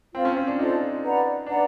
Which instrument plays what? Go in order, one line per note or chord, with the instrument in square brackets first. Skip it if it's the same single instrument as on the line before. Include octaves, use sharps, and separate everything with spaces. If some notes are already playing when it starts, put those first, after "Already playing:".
[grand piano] C4 [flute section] F4 A4 C5 F5
[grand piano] C#4
C#4
D4
[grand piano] D#4 [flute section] F4 A4 C5 F5
[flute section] B4 D5 F#5 A#5
[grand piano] D4 [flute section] B4 D5 F#5 A#5